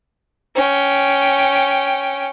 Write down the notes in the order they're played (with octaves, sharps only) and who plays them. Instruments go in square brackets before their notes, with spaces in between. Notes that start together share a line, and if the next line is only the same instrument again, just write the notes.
[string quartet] C#4 G5